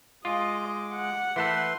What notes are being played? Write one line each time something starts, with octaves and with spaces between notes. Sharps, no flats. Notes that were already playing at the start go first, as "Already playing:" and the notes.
G#3 F4 D#5 D6
F#5
E3 A3 A4 B4 E5 C6